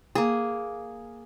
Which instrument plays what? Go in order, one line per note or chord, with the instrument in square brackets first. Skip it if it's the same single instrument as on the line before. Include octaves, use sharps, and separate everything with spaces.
[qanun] A#3 G#4